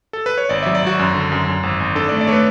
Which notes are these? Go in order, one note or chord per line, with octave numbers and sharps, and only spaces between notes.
A4
B4
C#5
G#1 D5
F#3 E5
D5
G#1 F#4
F#2
D3
F#2
F#2
G#1
G#1
D4 A4
A3 D5
D5
A3 B4 C#5